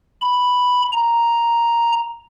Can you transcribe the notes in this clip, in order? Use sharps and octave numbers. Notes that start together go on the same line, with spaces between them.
B5
A#5